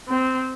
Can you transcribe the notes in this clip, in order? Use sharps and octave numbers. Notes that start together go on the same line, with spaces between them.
C4